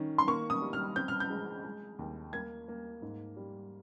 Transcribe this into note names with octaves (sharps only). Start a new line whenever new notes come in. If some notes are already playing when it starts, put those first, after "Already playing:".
Already playing: D#3 C#4
C6
A#3 C#6
D#6
G3
F6
C4 G6
F6
G6
G#3
G#3
D#2
A#3 G#6
A#3
G#2
G3